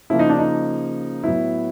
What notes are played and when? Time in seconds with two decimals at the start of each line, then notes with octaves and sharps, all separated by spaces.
0.10 C#3 F3 A#3 E4
0.19 D#4
0.30 D4
0.39 D#4
1.23 A2 F#3 B3 E4